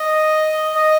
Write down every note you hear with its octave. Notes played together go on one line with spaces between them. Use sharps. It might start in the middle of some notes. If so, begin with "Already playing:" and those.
Already playing: D#5
D#5